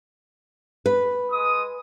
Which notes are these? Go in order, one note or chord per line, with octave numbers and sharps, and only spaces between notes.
B4
G#3 D#6